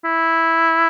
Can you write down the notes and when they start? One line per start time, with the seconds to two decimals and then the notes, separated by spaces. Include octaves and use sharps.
0.04 E4